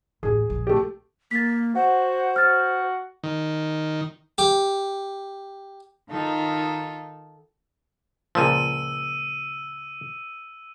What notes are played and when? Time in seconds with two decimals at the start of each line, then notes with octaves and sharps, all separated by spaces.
0.23 A1 D#2 G#4
0.50 A#1
0.67 A3 G4
1.31 A#3 A6 B6
1.75 F#4 C5 F#5
2.36 F#4 F6 A6
3.23 D#3
4.38 G4
6.10 D#3 D#4 F4 A4
8.35 C#2 A#2 F3 E6 D#7